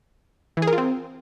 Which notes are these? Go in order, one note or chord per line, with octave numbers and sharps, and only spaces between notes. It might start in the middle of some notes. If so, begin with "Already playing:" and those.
E3
G#4
A#4
F4
C4